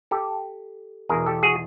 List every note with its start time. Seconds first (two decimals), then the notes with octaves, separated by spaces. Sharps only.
0.11 G4 A4
1.09 E2 B2 G#4 A#4
1.26 G4 A4
1.43 F#4 G#4